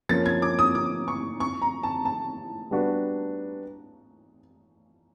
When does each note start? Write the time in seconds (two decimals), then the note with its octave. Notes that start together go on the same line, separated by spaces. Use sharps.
0.09 F3 A#3 C#4 A6
0.26 G#6
0.42 D6
0.59 D#6
0.75 D6
1.08 C#6
1.40 C#6
1.62 A#5
1.83 A5
2.05 A5
2.71 G3 B3 D4 F#4 B4